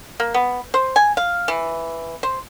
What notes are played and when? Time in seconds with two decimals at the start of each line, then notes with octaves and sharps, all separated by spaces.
0.20 A#3
0.34 B3
0.74 C5
0.96 G#5
1.17 F5
1.48 E3
2.23 C5